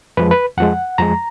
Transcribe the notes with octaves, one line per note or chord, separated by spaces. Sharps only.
F2 F3 G#3 B4
B4
F2 F3 G#3 F#5
F2 F3 G#3 A#5